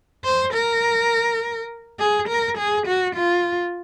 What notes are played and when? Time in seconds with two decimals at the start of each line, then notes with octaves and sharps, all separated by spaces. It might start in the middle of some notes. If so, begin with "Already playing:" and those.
0.24 C5
0.54 A#4
1.99 G#4
2.29 A#4
2.58 G#4
2.87 F#4
3.16 F4